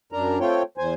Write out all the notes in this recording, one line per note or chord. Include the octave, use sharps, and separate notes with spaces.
F#2 D4 A#4 A#5
A3 C4 F4 C#5 G5
E2 C5 G#5